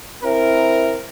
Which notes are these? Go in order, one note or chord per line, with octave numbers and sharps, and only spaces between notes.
C4 E4 A#4